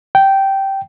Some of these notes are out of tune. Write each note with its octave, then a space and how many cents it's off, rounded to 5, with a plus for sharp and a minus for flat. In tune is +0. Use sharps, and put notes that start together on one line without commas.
G5 -10